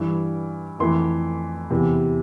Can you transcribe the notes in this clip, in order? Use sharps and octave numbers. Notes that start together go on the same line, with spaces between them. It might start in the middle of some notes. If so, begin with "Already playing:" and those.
Already playing: G2 E3 G3
F2 E3 A3 C6
E2 C3 E3